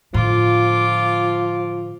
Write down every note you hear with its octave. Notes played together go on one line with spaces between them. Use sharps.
A2 D3 F3 F4 D6